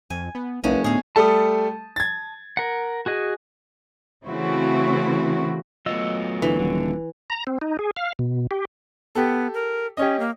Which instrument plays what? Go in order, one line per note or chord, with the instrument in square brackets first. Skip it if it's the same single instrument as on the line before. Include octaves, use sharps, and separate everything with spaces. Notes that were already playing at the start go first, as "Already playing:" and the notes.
[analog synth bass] F2 [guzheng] G#5
[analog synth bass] B3
[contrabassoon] F#1 [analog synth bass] B1 [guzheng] G#3 C#4 D#4 [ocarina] B4
[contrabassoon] D2 [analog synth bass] A2 [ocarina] B3 [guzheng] G#4 F5
[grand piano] G3 A3 A4 [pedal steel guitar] A5 D#6
[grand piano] G#6 A6
[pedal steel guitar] A#4 F#5
F#4 G#4 D#5
[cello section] C#3 E3 A3 C4 E4 F#4
[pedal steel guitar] F#3 D#5 E6 [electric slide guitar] A3 B3 F4
[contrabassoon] D2 [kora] E3
[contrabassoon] D#1 [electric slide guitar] D3
[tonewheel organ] A#5
C4
D#4
G#4
F5
B2
G4
[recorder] B3 [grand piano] G4 A4
[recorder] A#4
[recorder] C#4 [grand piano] G4 C#5 D#5
[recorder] A#3